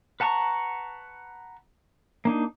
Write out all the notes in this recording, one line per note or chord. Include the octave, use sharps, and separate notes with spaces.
B4 F#5 A5 A#5 C#6
A#3 D4 D#4